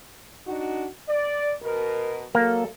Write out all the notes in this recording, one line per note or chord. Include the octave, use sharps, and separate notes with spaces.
D4 D#4 F#4
D5
B2 A#4
F#3 A#3 A4